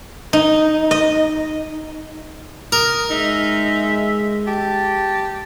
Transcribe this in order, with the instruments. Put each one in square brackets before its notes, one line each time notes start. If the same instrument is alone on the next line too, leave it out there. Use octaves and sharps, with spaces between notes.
[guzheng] D#4
D#5
[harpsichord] A#4 [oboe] D#6
[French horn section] G#3 [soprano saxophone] D#4 [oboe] E5
[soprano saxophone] G4 [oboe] A5